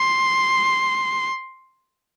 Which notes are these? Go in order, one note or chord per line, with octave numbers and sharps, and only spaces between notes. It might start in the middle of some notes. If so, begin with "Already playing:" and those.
Already playing: C6